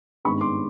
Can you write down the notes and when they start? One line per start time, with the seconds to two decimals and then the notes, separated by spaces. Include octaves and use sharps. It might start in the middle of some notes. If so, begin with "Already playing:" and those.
0.25 G#1 G2 D#3 G#3 B3 B5 C#6
0.41 C6 D6